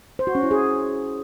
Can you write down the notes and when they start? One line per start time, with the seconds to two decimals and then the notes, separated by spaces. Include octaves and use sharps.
0.19 C5
0.27 F#4
0.35 C#4
0.43 E4
0.51 G#4